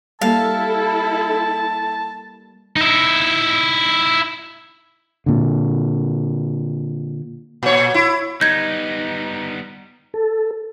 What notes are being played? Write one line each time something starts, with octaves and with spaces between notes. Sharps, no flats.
G3 A#3 E4 A4 F5 A5
D#4 E4
A#2 D3
A#2 C#5
E4
G3 B3 D#4 G6 G#6
A4